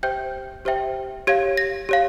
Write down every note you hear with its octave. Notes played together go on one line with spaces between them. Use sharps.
G4 C5 E5 G5 G6
G4 C5 E5 G5
G4 C#5 F5 G#6
A#6
G4 C#5 F5